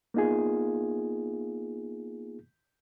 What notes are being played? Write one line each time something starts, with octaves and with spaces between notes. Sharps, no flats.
A#3 B3 D#4 F4 G#4